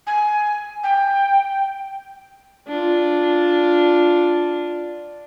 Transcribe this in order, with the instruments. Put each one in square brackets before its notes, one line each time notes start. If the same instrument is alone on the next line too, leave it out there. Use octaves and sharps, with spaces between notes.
[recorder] G#5
G5
[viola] D4 F4